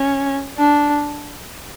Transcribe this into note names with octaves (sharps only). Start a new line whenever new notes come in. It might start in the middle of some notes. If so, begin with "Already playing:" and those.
Already playing: C#4
D4